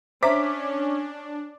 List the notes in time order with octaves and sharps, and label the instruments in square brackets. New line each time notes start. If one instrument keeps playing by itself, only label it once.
[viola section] C#4 [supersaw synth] D4 [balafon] C5 E5 A#5 [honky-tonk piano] D6 B6